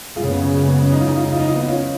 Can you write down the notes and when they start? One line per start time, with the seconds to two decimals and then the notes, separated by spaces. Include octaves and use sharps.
0.16 F#2 C#3 G#3 F4 G#4
0.24 C#4
0.29 B3
0.41 C#4
0.55 C#4
0.67 B3
0.80 C#4
0.92 D#4
1.01 F4
1.08 D#4
1.16 F4
1.24 D#4
1.32 F4
1.40 D#4
1.48 F4
1.56 B3 D#4
1.69 C#4 F4